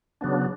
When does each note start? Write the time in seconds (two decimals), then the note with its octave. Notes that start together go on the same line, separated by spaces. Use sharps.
0.21 C#3 F#3 B3 D4